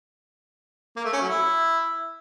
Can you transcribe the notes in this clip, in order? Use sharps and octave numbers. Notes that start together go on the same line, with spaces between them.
A#3
A3
C#4
F#3
E4